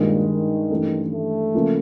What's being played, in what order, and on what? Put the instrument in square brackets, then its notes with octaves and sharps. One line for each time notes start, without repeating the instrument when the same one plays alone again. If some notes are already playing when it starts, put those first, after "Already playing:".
Already playing: [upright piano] G2 D#3 G#3 [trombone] A#2
[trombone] D#3
[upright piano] G2 E3 A3 C#4
[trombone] A3
[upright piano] C#3 F3 A#3